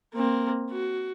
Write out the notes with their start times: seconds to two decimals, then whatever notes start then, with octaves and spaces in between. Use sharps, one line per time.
0.14 A#3 C4
0.71 F#4